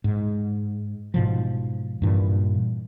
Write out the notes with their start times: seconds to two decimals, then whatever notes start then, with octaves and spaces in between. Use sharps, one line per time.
0.04 G#2
1.14 G#2 B2 F3
2.02 G2 A#2 E3